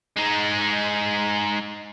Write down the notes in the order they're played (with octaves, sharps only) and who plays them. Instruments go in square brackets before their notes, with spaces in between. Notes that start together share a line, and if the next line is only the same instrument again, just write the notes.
[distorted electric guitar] G#3 D#4